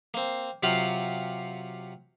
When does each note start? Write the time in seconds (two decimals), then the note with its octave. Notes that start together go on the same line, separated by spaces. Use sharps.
0.14 A#3 C4
0.63 C3 F#3 F4 G4 F5 F#5